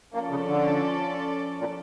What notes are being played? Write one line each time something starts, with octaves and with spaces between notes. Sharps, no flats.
F3 A#3 C#4 F4 A4 D5
C#3
D3
A#2